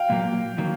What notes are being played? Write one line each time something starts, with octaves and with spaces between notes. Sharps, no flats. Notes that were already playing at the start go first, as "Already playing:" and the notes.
Already playing: F5 G5
A#2 F#3 A#3
D#3 F#3 A#3